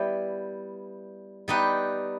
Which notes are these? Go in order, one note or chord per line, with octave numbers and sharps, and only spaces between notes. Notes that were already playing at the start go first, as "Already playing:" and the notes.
Already playing: G3 B3 E4 G4
G3 B3 D#4 G4 B4